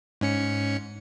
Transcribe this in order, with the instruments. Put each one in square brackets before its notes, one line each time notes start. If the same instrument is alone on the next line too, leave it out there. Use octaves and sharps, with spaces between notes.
[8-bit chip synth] G#2 C#4 C#7